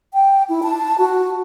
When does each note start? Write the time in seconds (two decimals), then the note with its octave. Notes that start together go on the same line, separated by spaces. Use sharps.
0.14 G5
0.49 E4
0.63 A5
0.98 F#4